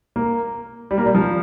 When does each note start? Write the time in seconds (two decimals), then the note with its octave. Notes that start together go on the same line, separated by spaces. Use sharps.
0.16 A#3
0.91 G3
0.98 A#3
1.06 G3
1.15 F3